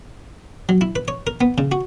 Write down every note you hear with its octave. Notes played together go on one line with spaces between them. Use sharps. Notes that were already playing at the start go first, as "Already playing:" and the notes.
F#3
E4
B4
C#5
A#4
B3
C#3
F#4